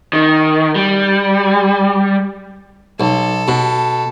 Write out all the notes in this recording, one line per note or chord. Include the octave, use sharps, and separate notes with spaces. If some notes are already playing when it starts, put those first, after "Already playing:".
D#3
G3
B1 A4
B2